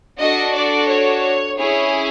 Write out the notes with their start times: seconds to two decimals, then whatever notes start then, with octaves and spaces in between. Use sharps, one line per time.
0.19 D4 F#4 A4 D#5
0.54 D5
0.89 C#5
1.58 C#4 E4 G#4 C#5